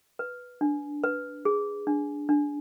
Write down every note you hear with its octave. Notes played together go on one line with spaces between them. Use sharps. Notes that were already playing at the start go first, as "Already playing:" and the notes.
B4
D4
B4
G#4
D4
D4